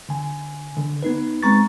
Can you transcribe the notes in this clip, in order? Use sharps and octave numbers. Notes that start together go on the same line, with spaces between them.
D3 G#5
D3
B3 D#4 B4
G#3 C4 A#5 C#6 A6